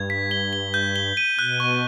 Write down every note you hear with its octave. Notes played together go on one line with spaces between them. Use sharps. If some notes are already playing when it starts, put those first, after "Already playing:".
Already playing: G2 G#6
B6
G7
G7
G6
G7
D#7
B2 F#6
C#6